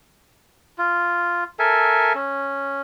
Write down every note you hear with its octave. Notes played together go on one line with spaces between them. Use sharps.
F4
A4 A#4 E5 G#5
C#4